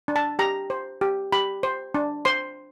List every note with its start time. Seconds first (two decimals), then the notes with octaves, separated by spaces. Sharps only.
0.08 D4
0.16 A5
0.39 G4 A#5
0.70 C5
1.01 G4
1.32 G4 B5
1.63 C5
1.94 D4
2.25 C5 C6